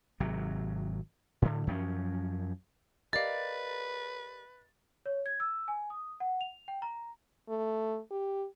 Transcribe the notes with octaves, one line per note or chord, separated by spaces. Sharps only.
G#1 C3 F#3
A2 D3
F#2 F3 B3 C#4
G4 A#4 B4 D5 D#5 F5 A6
C#5
G#6
E6
G#5
D#6
F#5
F7
G5
A#5
A3
G4